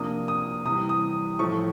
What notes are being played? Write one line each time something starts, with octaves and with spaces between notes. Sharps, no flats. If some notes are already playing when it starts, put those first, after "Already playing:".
Already playing: C3 F3 A#3 D4 D#6
D#6
C3 E3 G3 D#6
D#6
A2 F3 A3 C#6